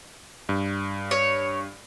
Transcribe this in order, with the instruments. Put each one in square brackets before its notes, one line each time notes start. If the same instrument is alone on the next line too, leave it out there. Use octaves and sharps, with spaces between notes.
[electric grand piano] G2
[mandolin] C#5